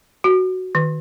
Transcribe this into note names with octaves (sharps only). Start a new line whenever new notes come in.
F#4
D#3